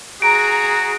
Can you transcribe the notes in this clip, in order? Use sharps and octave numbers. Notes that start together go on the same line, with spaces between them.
F#4 G#4 A#5 D7